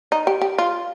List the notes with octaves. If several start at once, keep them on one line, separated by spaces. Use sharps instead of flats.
D#4
G4
G4
F4